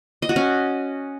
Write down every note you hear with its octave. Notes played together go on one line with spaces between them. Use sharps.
D#5
F#4
C#4